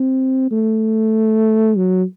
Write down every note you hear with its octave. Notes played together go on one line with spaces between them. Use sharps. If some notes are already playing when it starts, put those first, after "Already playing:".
Already playing: C4
A3
F#3